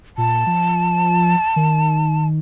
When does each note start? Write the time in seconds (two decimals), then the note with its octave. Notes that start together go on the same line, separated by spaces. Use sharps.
0.18 A#2 A5
0.47 F3
1.56 D#3